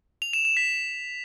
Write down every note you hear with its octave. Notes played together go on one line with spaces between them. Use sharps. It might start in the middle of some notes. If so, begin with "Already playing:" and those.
F7
E7
E7
B6